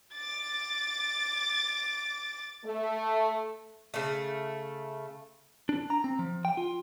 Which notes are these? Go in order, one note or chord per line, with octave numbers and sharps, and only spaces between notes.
D6 A6
A3
C#3 A3
D4
A#5
C4
F3
G5
F4